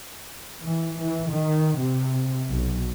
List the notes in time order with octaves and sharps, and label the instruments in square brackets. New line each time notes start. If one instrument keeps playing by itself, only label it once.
[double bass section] E3
E3
D#3
C3
B1